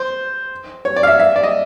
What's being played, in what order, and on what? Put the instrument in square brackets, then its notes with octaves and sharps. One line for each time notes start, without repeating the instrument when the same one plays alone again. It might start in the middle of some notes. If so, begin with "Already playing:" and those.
Already playing: [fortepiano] C5
C#5
D5
F5
E5
E5
D5
D#5